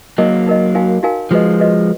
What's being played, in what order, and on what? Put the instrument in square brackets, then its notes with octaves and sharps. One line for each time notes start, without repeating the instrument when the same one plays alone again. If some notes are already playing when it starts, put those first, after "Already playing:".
[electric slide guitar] F#3 A#3 [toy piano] D#4 A#4 D#5
[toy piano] D#4 A#4 D#5
D#4 F#4 A#4 F5 G#5
D#4 F#4 A#4 F5 G#5
[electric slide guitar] F3 G#3 [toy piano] F#4 B4 D#5
[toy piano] F#4 B4 D#5